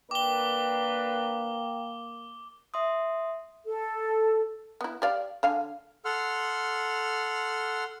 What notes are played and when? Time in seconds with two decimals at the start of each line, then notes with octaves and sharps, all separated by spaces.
0.11 A#3 D4 A#4 B4 G5 D6 G7
2.74 E5 C6 D#6
3.66 A4
4.81 B3 E4
5.02 G4 D5 F5
5.43 D3 F5 G#5
6.05 A4 F#5 C6 F6